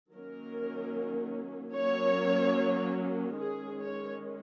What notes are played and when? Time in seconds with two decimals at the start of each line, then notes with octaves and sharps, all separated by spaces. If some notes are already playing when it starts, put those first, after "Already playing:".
0.13 D#3 F#3 A#3 C#4 A#4
1.76 F#3 A#3 C#4 C#5
3.39 D#3 G#3 C#4 G#4
3.80 C#5